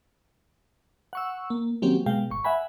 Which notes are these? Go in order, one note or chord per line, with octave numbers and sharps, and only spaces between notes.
F#5 C#6 E6
A#3
D#3 F#3 A#3 C4 C#4 G4
B2 G#3 F5 G5
G#1 C#6
E5 F#5 G#5 B5